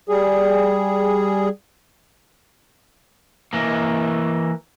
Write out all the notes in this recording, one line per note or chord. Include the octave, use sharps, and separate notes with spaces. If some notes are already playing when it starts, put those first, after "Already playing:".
G3 G#4
E3 A#3